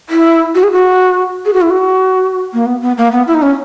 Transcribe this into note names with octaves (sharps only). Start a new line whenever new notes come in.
E4
F#4
G#4
F#4
G#4
F#4
E4
F#4
A#3
B3
B3
A#3
B3
E4
D#4
C#4